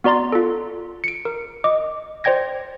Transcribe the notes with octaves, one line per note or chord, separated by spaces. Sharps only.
B3 F#4 D5 A#5 C6 A6
F4 A4
C#7 D7
A#4
D#5 D6
C5 D5 G5 G#6 A#6